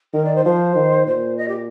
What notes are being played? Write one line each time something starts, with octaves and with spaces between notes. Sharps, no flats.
D#3 A#4
D5
C5
F3 C5
D#3
A#2 C5
D#5
G4